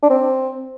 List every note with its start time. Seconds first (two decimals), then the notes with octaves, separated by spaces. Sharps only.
0.03 D4
0.10 C4